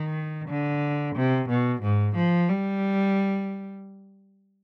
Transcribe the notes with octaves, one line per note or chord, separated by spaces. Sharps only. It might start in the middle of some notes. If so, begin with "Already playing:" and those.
Already playing: D#3
D3
C3
B2
G#2
F3
G3